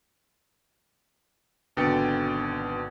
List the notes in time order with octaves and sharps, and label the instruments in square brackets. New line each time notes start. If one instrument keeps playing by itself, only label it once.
[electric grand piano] G#1 B2 D3 G5 A6 C#7